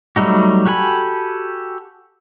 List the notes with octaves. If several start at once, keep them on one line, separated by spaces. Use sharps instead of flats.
F#3 G3 A3 D#4 F#4
F#4 G4 A4 G#5 B5